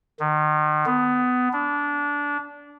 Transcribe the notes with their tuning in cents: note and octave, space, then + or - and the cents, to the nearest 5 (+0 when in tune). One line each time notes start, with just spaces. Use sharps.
D#3 -35
B3 +20
D4 -20